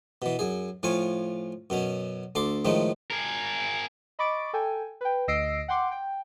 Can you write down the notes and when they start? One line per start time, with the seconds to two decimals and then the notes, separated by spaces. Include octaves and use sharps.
0.22 B2 E3
0.39 F#2 G#4
0.83 A2 F3 F4 G#5 C#6
1.70 F#2 B2 C#4
2.35 D2 A4 C6 D6
2.65 A2 D#3 F3 G#3 A3
3.11 G#4 A#4
4.19 D#5 B5 C#6 D6 A6 D7
4.53 A4 G5 G#5
5.01 B4 G5
5.28 D2 D#5 E6 A#6 C7 D7
5.68 F#5 G5 C6 D6
5.91 G5